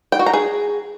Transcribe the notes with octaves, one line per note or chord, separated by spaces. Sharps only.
G5
F#4
A#5
G#4